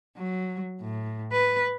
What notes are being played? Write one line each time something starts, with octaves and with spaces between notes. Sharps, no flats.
F#3
A2
B4